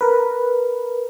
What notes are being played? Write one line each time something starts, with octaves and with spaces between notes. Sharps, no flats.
A#4 B4